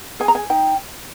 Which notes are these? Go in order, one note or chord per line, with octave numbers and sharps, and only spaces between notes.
G#4 G#5
A#5
G#5
D#4 G5